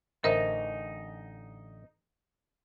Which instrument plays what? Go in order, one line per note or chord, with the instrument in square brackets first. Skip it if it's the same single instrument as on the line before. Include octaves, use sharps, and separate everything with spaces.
[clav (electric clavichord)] A1 D3 D#5 [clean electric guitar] D#4 [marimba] A#4 C5 E5